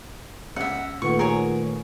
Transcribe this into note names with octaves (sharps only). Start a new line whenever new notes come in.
C#2 E5 F#5
A#2 D#3 A3 F4 B4 F#5 C#6
G#4 A#4 C#5 G#5